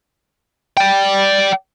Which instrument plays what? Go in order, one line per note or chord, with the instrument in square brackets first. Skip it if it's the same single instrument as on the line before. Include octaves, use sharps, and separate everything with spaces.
[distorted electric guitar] D5 G5